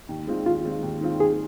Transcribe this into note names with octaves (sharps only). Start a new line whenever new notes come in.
D#2
D#3 G#3 C4 F4
D#2 F4
D#3 G#3 C4 F4
D#2
D#3 G#3 C4 F4
D#2 G#4